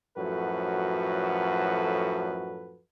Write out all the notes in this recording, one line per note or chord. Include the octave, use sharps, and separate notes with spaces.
F#2 A2 F3 F#4 A4 B4